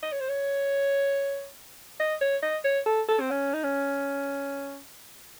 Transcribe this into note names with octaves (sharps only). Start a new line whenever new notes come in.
D#5
C#5
C5
C#5
D#5
C#5
D#5
C#5
A4
A4
C4
C#4
D#4
C#4